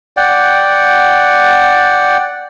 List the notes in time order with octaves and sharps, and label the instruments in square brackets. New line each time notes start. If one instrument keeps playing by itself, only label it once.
[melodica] D5 F#5 G5